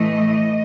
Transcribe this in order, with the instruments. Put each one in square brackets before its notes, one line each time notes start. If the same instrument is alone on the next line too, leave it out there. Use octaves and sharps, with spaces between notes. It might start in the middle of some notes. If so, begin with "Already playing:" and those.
Already playing: [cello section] A2 E3 A3 D#5